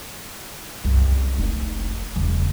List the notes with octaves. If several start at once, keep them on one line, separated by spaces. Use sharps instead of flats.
C2 F#2
F1 D#4
E1 C#3